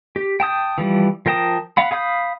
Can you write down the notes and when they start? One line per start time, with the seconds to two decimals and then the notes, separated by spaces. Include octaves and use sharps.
0.16 G4
0.40 G5 A5 D#6 G6
0.78 E3 F3 G3
1.26 F3 A#4 G5 A5 D#6
1.77 F5 F#5 B5
1.91 G#4 F5 B5 D#6 G6